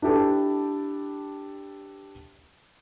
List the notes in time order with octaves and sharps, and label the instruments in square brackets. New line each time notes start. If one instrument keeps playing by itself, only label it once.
[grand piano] D4 E4 G4 A4 B4